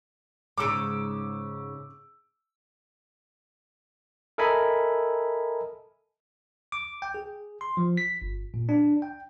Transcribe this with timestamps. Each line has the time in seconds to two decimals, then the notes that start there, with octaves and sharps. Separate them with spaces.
0.58 G#2 C#3 D6 E6 D7
4.38 A4 A#4 D#5 E5 G#5 B5
6.72 D6
7.02 G5
7.14 G#4
7.61 C6
7.77 F3
7.97 B6
8.22 G1
8.54 A#2
8.69 D4
9.02 G5